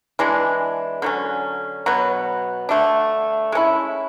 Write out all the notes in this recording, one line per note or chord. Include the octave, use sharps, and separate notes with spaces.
E3 G#3 D4
D3 F#3 C#4
B2 F#3 B3
D3 A3 D4
G#3 C#4 E4